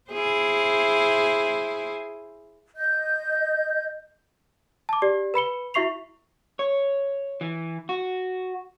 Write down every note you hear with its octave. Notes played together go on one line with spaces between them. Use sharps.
E4 G#4 C5
D#5 G6
A5 D6
G4 D5
B4 B5 C#7 G7
E4 F#4 E5 C#6 C7 F7
C#5
E3
F#4